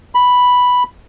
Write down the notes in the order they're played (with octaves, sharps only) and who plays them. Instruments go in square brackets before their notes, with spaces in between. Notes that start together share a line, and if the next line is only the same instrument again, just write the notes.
[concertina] B5